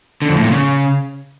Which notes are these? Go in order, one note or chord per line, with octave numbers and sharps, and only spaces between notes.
D3
F2
A2
A#2
C#3